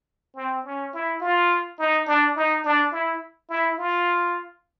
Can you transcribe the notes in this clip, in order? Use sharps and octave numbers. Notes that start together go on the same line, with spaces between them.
C4
C#4
E4
F4
D#4
D4
D#4
D4
E4
E4
F4